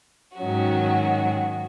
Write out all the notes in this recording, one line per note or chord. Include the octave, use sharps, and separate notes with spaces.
G#2 D#3 F#3 C#4 F#4